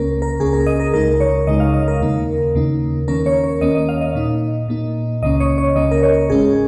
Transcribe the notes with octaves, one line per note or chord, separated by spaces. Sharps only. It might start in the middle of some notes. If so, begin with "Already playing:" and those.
Already playing: C#2 C#3 A#3 C#4 A#4
A#4
C#2 C#3 A#3 C#4 G#4
A#4
D#5
A#4
C#2 C#3 G#3 D#4 A#4
C#5
C#2 C#3 G#3 D#4 D#5
F5
D#5
A#4
D#2 C#3 A#3 D#4
D#2 C#3 A#3 D#4
D#2 D#3 A#3 C#4 A#4
C#5
C#5
D#2 D#3 A#3 C#4 D#5
D#5
F5
D#5
A#2 A#3 D#4
A#2 A#3 D#4
C#2 C#3 A#3 C#4 D#5
C#5
C#5
C#2 C#3 A#3 C#4 D#5
A#4
C#5
G#1 G#2 G#3 C#4 G#4